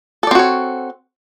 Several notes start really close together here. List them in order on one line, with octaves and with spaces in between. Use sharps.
A4 D5 C4 F#4 C#5